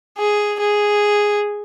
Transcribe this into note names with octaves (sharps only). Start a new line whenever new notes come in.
G#4
G#4